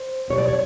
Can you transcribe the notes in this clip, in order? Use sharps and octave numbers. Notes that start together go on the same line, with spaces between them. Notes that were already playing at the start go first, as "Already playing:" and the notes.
Already playing: C5
B2 G3 B3 C#5
D5
C#5